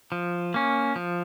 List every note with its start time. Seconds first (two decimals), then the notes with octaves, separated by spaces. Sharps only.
0.12 F3
0.54 A#3 C#4
0.96 F3